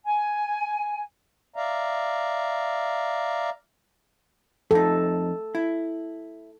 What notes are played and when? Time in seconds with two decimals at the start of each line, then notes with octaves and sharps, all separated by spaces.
0.05 G#5
1.56 D5 E5 F5 A#5
4.71 F2 D#4 A4
5.55 E4